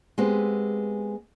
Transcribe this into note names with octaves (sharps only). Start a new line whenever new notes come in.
G#3 B3 C4 G4